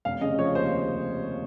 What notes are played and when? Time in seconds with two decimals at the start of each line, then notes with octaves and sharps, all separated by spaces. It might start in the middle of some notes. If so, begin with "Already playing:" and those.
0.05 F1 F5
0.21 C#3 D#5
0.39 F3 C#5
0.55 D#2 C5